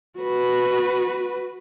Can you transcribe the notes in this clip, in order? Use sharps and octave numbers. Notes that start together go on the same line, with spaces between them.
F#4 B4